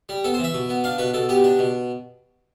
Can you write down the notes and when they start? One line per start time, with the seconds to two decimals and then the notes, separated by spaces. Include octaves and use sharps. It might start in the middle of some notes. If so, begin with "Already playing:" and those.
0.09 G3
0.24 B3 A4
0.34 C5
0.39 E3 E5
0.54 B2
0.69 B3
0.84 D4 F5
0.98 B2 B4
1.14 B2 A4
1.29 B3 G4
1.44 D4
1.59 B2